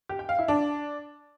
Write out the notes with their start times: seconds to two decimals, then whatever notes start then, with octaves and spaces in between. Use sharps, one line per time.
0.09 G4
0.19 G5
0.29 F5
0.39 E4
0.48 D4